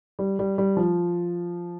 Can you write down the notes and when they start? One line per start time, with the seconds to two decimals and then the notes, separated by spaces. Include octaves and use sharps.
0.19 G3
0.39 G3
0.58 G3
0.77 F3